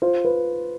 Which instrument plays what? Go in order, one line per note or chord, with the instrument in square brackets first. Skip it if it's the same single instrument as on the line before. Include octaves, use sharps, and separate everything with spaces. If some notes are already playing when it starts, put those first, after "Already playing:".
[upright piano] F4 [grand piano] C5
[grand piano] B4